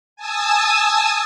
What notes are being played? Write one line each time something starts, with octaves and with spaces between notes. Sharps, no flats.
G#5 A5 D#6 E6